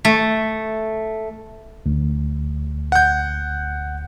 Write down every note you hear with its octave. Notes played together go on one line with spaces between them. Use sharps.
A3
D2
F#5 G6